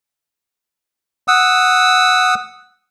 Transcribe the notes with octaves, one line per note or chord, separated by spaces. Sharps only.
F#5 D#6 E6